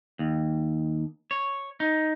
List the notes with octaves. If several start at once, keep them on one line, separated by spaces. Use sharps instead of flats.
D#2
C#5
D#4